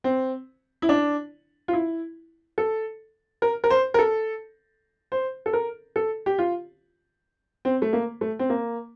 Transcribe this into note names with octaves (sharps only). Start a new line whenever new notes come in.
C4
E4
D4
F4
E4
A4
A#4
A#4
C5
A#4
A4
C5
A4
A#4
A4
G4
F4
C4
A3
A#3
A3
C4
A#3